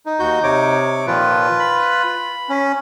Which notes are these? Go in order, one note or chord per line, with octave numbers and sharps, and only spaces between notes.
D#4
D#2 F#4 G6
C3 C#5 D6
A#2 D#3 F3 F4 B4
B5
C#4